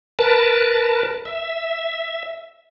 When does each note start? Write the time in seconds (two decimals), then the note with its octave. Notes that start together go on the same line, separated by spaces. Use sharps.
0.19 A#4 B4 A5
1.25 E5